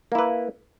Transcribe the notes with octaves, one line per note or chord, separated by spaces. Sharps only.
A#3 E4 B4